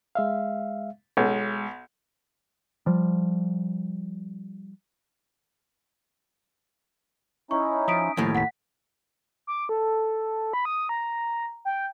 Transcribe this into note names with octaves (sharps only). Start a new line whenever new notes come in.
G#3 E5 F5
B1 G#3
F3 G3
C#4 D#4 E4 C#6
F3 D#6 B6 D7
D#2 A2 F3
F1 F#5 B6
D6
A4
B5
D#6
A#5
G5